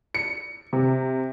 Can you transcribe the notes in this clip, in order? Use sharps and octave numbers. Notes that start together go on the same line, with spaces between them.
C#7
C3